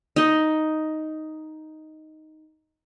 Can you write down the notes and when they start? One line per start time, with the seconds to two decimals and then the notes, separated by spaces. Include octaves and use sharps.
0.16 D#4 D#5